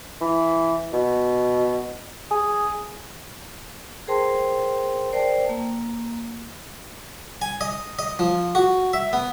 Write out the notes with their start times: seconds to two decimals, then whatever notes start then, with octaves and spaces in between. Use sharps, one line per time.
0.21 E3
0.93 B2
2.31 G#4
4.08 G#4 A#4 C5 G5 A5 C6
5.12 A#4 C5 D5 G5 A5
5.49 A#3
7.42 G#5
7.61 D#5
7.99 D#5
8.19 F3
8.55 F#4
8.93 E5
9.13 B3